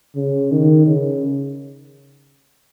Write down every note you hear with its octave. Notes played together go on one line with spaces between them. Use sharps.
C#3
D#3
C#3